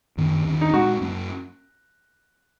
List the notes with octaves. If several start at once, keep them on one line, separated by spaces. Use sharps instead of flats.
F#2 D#3 A#3 C#4
D#2 D#3 A#3 C#4
D#4
A#2 G#3 C#4 F#4
F#2 F#3 A#3 C#4